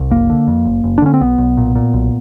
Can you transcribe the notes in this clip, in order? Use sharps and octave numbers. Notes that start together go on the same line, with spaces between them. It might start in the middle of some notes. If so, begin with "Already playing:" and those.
Already playing: C2
F#1 A#3
D3
F2
F#1
F#1
D4
D3 C#4
C4
B1 B3
B1
A#2
A#2
B1